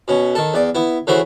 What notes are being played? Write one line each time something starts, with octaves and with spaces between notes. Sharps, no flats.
B2 C#4
D#3 A4
E2 D5
B3 E4
C#3 E3 A3 F#4 C5